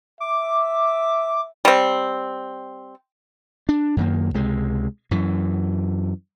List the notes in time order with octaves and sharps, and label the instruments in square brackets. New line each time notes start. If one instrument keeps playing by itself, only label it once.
[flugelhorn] E5 [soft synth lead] D6
[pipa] G3 C4
[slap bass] D4
F#2 D#3 A#3
C#2 C3 G#3
F#2 E3